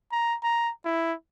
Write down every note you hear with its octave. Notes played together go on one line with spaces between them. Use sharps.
A#5
A#5
E4